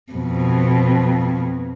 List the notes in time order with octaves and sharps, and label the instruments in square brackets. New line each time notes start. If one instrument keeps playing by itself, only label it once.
[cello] F2 B2